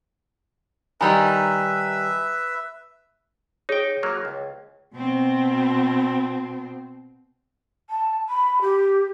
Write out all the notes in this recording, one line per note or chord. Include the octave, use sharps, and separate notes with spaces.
D#3 G3 D#4 B4 E5 G#5 A#5 B5
D#4 G#4 C#5 G5
F#3 A#3
C#2
B2 C4
A5
B5
G4